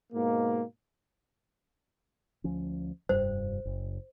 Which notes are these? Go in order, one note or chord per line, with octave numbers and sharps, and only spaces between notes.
G#2 B2 A#3
D2 F3 C#4
F1 G2 G3 C5
F#1